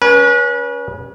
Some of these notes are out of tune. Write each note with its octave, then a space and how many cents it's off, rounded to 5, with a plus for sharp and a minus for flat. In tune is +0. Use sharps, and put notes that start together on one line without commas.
C#4 +15 B4 -35